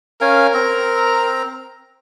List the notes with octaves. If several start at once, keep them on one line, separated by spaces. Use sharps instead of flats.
C#4 A#4 F5 G#5
C4 A#5